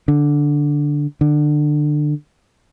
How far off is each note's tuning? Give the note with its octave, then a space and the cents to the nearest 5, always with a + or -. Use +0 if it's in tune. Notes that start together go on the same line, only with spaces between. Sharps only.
D3 -5
D3 +20